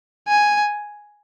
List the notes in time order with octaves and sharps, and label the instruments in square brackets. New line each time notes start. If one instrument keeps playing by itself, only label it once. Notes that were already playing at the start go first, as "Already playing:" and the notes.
[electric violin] G#5